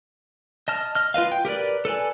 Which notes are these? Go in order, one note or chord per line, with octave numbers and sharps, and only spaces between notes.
D#5 A5 F6
D#5 F6
F4 B4 D#5 F5
G5
G4 A#4 B4 D5
A4 B4 D5 G#5